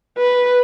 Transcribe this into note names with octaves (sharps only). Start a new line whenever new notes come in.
B4